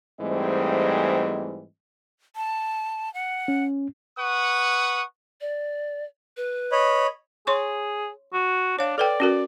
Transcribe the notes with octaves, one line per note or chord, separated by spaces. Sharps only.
G#2 E3 G3 A3 C4 D#5
A5
F#5
C#4
B4 F#5 C#6 D#6
D5
B4
C#5 D#5 B5
G#4 C#5 C6 C#6
F#4
D4 C#5 F5
A4 B4 D5 G5
C#4 F#4 A#4